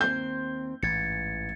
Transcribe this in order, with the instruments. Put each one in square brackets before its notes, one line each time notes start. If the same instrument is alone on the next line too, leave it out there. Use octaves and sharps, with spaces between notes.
[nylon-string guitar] D#2 C4 C5 [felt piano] G6
[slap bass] A1 G#2 [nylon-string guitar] E3 [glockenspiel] G#6 A6 C#7